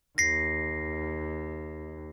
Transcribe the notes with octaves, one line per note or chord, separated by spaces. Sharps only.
D#2 A#6 C7